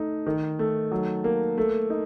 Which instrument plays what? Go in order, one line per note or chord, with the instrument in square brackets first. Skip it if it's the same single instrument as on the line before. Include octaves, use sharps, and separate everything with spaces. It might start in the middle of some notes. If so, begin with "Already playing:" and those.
Already playing: [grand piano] A3 D#4
D#3
A3
F#3
A#3
A3
D#4